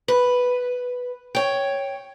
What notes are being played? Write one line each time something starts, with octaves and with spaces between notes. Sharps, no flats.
B4
C#5 G5